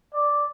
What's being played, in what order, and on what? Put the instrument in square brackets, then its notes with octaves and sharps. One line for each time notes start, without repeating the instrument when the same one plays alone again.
[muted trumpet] D5